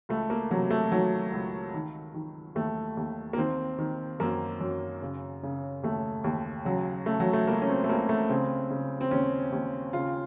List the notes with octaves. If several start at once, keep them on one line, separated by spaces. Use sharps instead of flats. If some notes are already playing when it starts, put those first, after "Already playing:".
C#2 A3
A#3
C3 F#3
A3
D#3 F#3
C#2
D#3
D#3
D#2 A3
D#2
A#3
D#3 C4
D#3
F#2 A#3
F#2
C#3
C#3
D#2 A3
D#2
C#3 F#3
C#3 A3
F#3
A3
C#2 A#3
C#4
C4
A3
C#2 A#3
A3
C#3 C4
C#3
C4
D#2 C#4
D#2
C#3 F4